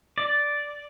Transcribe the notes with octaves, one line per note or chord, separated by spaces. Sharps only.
D5